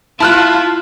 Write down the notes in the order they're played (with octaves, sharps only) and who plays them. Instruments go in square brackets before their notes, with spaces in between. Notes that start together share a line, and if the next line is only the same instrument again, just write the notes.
[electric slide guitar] E4 [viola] F4 [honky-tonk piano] A5 F6 F#6